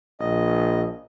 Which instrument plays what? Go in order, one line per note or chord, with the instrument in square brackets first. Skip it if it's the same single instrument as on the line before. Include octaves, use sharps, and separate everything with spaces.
[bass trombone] A#1 [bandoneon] D#5